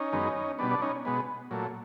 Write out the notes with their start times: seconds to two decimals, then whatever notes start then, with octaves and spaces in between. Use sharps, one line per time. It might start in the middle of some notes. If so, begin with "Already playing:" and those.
Already playing: C#4 D#4
0.12 F#2 D#3 G#3 B3
0.59 B2 G3 B3 D4
0.70 D4
0.82 C#4 D#4
1.05 B2 G#3 B3
1.51 A#2 F#3 A3